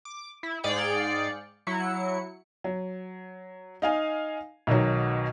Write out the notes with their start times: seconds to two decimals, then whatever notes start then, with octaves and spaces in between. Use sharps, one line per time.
0.05 D6
0.43 E4
0.63 G#2 G#4 D5 F5 G5 C#7
1.67 F#3 E4 C#7
2.64 F#3
3.82 D#4 F5 G#5
4.67 B1 B2 D#3 F#3